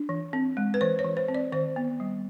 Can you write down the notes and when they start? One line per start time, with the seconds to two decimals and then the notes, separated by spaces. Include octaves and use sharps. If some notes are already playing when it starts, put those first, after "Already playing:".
Already playing: D4
0.09 E3
0.33 C4
0.57 G#3
0.74 B4
0.81 E3 C5
0.99 C#5
1.04 E3
1.17 C5
1.28 C4
1.35 D5
1.52 D#3 C5
1.76 B3
2.00 G3